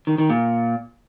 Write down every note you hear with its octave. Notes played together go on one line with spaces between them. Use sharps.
D#3
D#3
A#2